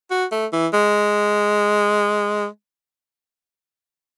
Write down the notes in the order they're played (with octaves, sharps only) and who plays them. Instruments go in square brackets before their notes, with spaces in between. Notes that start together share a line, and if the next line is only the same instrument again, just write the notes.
[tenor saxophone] F#4
A3
E3
G#3